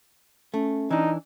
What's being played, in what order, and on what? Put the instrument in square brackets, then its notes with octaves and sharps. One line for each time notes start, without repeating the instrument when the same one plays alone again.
[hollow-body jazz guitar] A3 [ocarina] C#4
[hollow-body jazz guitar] E3 D4 [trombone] D#4